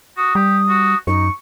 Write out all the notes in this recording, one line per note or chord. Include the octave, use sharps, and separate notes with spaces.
F#4 D#6
G3 G4
F#4
F#2 D#4 C#6